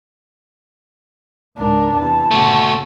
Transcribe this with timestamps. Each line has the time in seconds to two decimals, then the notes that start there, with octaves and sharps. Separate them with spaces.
1.58 C#2 G#2 C#3 D4 A#4
1.97 E2 C3 E3 A5
2.31 G1 A#2 C#3 A3 F#4